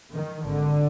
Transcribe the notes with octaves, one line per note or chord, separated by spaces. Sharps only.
D#3
G#1 G#2 D3